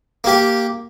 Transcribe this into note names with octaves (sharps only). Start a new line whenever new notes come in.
A#3 G4